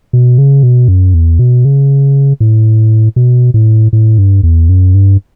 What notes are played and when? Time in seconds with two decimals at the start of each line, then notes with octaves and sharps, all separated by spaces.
0.13 B2
0.38 C#3
0.63 B2
0.88 F#2
1.14 E2
1.39 B2
1.65 C#3
2.40 A2
3.16 B2
3.54 A2
3.93 A2
4.18 G2
4.43 E2
4.69 F#2
4.94 G2